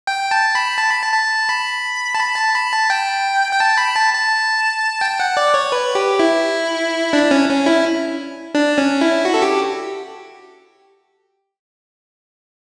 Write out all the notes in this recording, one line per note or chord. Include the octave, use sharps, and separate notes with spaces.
G5
A5
B5
A5
B5
A5
A5
B5
A5
B5
A5
B5
A5
G5
G5
A5
B5
A5
A5
G5
F#5
D5
C#5
B4
G4
E4
D4
C#4
C#4
E4
D4
C#4
E4
F#4
A4
G4